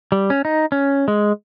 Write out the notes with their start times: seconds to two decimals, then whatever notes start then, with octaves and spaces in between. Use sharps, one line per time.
0.12 G3
0.30 C#4
0.45 D#4
0.72 C#4
1.08 G#3